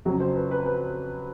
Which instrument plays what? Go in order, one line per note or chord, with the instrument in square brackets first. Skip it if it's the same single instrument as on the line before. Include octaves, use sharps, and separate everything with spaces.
[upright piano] F2 C#3 F#3
C5
B4
B4
B4